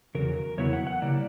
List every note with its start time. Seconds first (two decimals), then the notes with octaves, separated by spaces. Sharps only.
0.15 E2 C#3 F#3 A#4
0.57 E2 C#3 F#3 B3 E4 C#5
0.73 F#5
0.87 F#5
1.02 C#3 G3 A#3 E4 D5